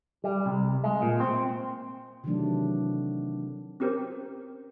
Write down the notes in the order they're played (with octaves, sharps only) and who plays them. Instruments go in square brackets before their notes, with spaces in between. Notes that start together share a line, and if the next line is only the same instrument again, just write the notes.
[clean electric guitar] G3
C2
G#3
A#2
C4
[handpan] C3 D#3 E3 F#3 A3 D4
[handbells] C4 C#4 G4 A#4 C5